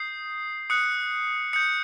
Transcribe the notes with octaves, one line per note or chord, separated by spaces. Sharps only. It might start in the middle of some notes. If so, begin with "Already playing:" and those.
Already playing: D#6 G6 C7
D#6 F#6 C#7
D#6 G6 C#7